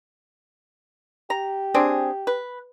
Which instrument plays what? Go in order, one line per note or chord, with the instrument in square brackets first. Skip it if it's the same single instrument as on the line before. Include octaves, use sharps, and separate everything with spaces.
[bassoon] G4 [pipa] A#5
[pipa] C4 D4 G#4
B4